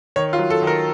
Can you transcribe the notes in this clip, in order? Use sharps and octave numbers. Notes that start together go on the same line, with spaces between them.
D#3 C#5
F4
F#3
A4
D#3
A#4